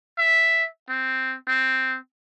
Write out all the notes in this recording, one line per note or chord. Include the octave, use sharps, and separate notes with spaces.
E5
C4
C4